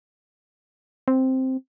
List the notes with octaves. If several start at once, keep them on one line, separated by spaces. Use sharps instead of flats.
C4